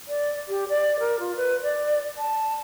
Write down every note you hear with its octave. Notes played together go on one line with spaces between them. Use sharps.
D5
G4
D5
A#4
F4
B4
D5
A5